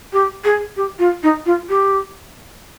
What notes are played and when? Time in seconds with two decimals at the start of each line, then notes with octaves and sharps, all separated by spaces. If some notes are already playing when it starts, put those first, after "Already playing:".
0.13 G4
0.44 G#4
0.77 G4
0.99 F4
1.23 D#4
1.46 F4
1.69 G4